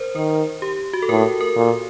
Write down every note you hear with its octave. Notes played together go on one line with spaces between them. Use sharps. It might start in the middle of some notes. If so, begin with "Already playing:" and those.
Already playing: A#4 C5
D#3 A#4
G4
F#4
A4
A2 A#4
A#4
A#2